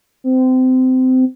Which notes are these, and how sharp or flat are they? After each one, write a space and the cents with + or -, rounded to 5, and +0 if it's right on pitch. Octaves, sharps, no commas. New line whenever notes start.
C4 -25